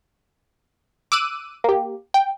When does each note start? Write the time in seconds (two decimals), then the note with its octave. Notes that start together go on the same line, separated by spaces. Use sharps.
1.12 D6 E6 F#6 D#7
1.64 A#3 G4
2.14 G5